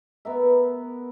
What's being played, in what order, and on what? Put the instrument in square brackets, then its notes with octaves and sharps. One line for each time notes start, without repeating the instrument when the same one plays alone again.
[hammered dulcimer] B3 A#4 E5